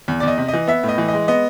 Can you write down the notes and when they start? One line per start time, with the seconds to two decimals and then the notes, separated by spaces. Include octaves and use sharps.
0.08 E2
0.20 D5
0.23 E2 D#5
0.38 C3
0.48 D#5
0.53 E3
0.67 B3 E5
0.84 A2 D#5
0.98 E3
1.08 D#5
1.13 G#3
1.28 B3 D#5